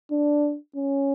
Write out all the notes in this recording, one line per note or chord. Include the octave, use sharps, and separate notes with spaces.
D4
C#4